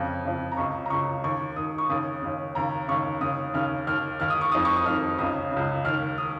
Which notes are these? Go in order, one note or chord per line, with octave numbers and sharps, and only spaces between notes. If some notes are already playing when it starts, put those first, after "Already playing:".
Already playing: F2 C#3
F2 C#3
A#5
C#2 C#3 C#6
A#5
C#2 C#3 C#6
D#2 D#3 C#6
D#2 D#3 D#6
C#6
D#2 C#3 D#6
D#2 C#3
D#2 C#3 A#5
D#2 C#3 C#6
D#2 C#3 D#6
D#2 C#3 F6
D#2 D#3 F6
D#2 D#3 F6
D#6
C#6
F2 D#3 D#6
C#6
D#6
F2 D#3 F6
C#2 C#3 D#6
C#3
C#2
D#2 D#3 F6
D#3 D#6